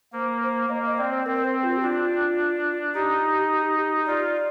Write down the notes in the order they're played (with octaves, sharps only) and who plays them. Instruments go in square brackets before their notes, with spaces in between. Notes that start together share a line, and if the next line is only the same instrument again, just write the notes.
[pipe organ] A#3 [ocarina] C5
[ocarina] C5
[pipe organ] A#3 [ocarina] D#5
[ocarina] D#5
[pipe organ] C4 [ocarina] D5
[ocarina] C5
[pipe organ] C4 [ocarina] A#4
[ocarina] C5
F4
G4
[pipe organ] D4 [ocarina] F4
[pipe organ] D#4 [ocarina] G4
[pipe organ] F4 [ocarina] D5